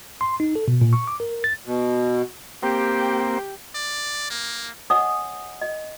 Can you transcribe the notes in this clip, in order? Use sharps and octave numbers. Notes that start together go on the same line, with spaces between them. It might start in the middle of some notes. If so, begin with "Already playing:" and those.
C6
D#4
A4
B2
A#2
C#6
D6
A#4
A6
B2
A#3 C4 G4 G5
D5
A#3
C#5 D#5 F#5 G#5 D#6
D#5